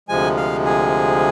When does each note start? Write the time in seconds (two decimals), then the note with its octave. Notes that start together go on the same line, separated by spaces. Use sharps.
0.09 D2 C3 F3 G#3 G#5
0.37 F5
0.65 G#4